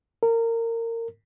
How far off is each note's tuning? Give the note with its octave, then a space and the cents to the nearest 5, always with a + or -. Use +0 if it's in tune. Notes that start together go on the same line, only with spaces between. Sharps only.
A#4 -25